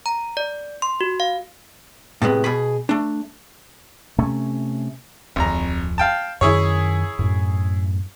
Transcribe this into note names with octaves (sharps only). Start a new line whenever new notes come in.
A#5
D5
C6
F#4
F5
A2 C3 G#3 B3
B2 G#4 B5
A3 D4
C3 A3 C#4
D1 G#1 F2 A#5
F5 G5 A5
F#2 D#3 E4 G#4 C#5
F#2 A2